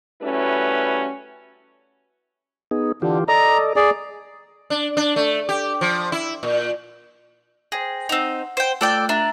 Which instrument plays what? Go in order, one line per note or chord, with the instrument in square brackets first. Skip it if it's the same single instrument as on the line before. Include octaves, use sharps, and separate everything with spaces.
[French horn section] G3 A3 C#4 E4 F#4 B4
[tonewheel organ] B3 D#4 G#4
[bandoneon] D3 [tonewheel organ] E3 F4 G4
[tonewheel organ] A4 D5 D#5 [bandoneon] A#5
[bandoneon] G#4 D5
[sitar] D4
D4
A3
G4
F3
E4
A#2
[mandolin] G#4 [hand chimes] C5 G5 A#6
[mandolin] C4 D#4 [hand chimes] F#5
[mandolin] C5 G5
[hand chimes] A3 F4 F#6 [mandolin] A4 D5 G5
[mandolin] D4 [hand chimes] E5 A#5